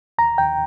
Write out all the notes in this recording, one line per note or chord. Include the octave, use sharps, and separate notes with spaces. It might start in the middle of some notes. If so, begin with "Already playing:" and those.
D#2 A#5
D#2 G5